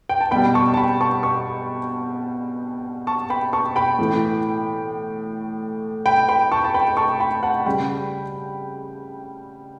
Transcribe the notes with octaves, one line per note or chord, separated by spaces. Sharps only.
G5
A5
B2 G3 G5 B5
A5 C#6
A5
G5 B5
A5 C#6
A5 C#6
A5 C#6
G5 B5
A5 C#6
G5 B5
A2 E3 A3
G5 B5
G5 B5
A5 C#6
A5
G5 B5
A5 C#6
G5 B5
F#5 A5
C#3 G3 G5 B5